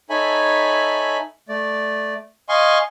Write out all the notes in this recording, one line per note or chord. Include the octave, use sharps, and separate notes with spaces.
D#4 A4 C#5 E5 G#5 B5
A3 D5
D#5 F5 G#5 C6 C#6